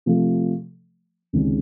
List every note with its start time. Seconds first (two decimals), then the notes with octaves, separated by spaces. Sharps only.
0.06 C3 F3 A3
1.33 C#2 C3 D#3 G#3 C#4